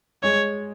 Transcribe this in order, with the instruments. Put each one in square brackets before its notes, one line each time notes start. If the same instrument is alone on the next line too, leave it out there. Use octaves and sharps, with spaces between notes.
[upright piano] G#3 G#4 [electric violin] C#5